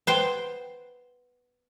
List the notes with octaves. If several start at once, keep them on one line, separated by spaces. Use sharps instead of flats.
B3 C5 G5